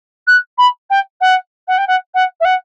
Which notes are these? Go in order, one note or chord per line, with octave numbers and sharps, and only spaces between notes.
F#6
B5
G5
F#5
F#5
G5
F#5
F#5
E5
F#5